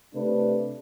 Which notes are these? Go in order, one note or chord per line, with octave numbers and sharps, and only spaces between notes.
C3 A3 D4 B4